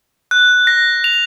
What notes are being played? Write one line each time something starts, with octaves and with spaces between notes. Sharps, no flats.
F#6
A#6
F7